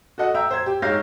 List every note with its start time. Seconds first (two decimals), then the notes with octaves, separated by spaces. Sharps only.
0.18 F#4 A4 D#5 F#5
0.34 E5 G5 A#5 E6
0.51 C5 G#6
0.66 G4
0.82 G#2 C#5 F5 G6 A#6